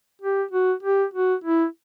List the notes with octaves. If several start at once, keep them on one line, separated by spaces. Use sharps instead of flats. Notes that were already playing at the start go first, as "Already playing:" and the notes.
G4
F#4
G4
F#4
E4